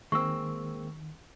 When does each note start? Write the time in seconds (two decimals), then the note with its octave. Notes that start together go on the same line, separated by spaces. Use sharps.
0.12 D#3 G#3 A#3 C4 C#6 E6